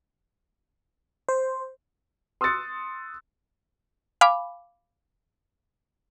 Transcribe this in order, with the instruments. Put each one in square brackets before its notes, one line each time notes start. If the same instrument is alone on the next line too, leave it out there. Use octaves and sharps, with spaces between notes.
[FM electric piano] C5
[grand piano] C6 D#6 E6 F#6 A6 C#7
[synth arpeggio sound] F5 G#5 B5 D6